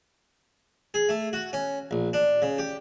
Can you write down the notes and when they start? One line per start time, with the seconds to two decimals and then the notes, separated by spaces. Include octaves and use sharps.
0.94 G#4
1.09 A3
1.33 F#4
1.53 C#4
1.91 A#1
2.13 D4
2.42 C#3
2.58 G4